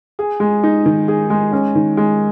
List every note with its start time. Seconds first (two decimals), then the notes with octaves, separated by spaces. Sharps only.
0.19 G#4
0.40 G#3
0.64 D#4
0.86 D#3
1.08 G#4
1.30 G#3
1.53 C#4
1.75 D#3
1.97 G#3